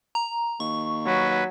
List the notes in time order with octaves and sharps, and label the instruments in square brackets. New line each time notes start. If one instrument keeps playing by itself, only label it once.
[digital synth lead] A#5
[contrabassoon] D#2 [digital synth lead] C#6
[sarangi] F#3 [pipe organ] B4